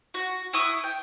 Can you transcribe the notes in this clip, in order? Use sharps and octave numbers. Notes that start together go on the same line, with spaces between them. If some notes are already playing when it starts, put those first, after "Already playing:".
F#4
E4 F#5 C#6 D#6
G5